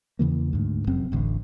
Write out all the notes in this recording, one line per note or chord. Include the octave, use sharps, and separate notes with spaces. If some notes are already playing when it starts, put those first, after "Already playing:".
E2 C#3 E3 A#3
D2 G#2
F1 F#2 C4
D1 A1 D2